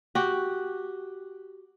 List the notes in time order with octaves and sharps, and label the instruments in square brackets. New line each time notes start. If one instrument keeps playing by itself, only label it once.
[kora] F#4 G4